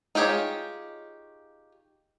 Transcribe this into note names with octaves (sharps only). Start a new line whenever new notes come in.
D#4 F4 G4 G#4 C#5